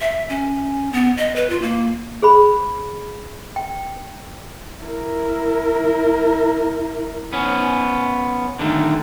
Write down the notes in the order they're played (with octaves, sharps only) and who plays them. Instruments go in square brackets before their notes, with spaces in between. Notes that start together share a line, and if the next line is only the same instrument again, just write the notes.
[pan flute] E5
C#4
B3
D#5
B4
F4
A#3
[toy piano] G#4 C5 B5
G5
[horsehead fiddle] E4 A#4
[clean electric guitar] B3 C#4
D3 D#3 A3